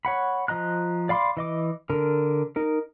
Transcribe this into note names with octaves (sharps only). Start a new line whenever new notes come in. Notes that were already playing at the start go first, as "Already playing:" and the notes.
C#5 F#5 B5
F3 D#5 A#5 F#6
D5 F5 B5 C6 D6
E3 D#5 D6
D3 A#4
D#4 A#4